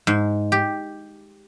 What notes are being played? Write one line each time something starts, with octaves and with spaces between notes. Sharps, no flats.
G#2
G4